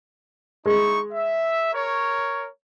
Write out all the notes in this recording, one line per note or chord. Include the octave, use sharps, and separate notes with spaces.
G#3 D#4 E4 C#6
E5
A#4 C#5